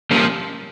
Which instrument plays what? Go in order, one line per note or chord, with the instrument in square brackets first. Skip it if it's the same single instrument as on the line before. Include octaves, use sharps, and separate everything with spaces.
[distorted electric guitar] F3 [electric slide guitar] G3 A#3 C#4